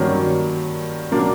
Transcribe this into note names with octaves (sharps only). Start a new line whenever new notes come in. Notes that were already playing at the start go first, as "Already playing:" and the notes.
Already playing: G2 D#3 F#3 A#3 C#4
A#2 F#3 A#3 D4